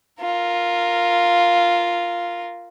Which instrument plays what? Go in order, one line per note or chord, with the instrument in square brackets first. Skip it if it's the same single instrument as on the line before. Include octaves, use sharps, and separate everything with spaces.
[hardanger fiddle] F4 A#4